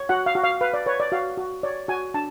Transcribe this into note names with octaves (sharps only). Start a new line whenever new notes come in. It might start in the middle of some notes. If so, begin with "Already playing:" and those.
Already playing: C#5
F#4 F#5
F5
F#4
F5
B4 F5
D5
B4 C#5
D5
F#4 F5
F#4
C#5 D5
F#4 G#5
D4 A5